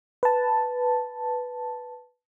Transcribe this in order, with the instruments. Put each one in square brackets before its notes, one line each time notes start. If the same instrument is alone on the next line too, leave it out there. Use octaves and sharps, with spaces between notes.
[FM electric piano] B4 A5